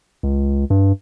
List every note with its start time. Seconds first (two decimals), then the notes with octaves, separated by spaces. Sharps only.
0.23 C#2
0.70 G2